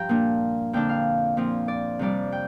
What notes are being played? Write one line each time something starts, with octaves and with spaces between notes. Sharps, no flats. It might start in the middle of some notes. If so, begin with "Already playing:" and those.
Already playing: G2 F3 G5 A#5
A#2 A#3 D4
F2 D3 A#3 D4 G5
F5
A#2 F3 C4
D5
F2 C3 G3 D5
G5